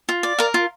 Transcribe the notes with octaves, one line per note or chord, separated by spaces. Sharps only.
F4
D5
A#4 F5
F4